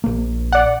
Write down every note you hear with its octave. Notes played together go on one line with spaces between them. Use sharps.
A#1 A#3
D5 F#5